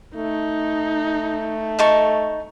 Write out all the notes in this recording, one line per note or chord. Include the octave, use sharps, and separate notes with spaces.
A3 D#4
D#4 A5 C#6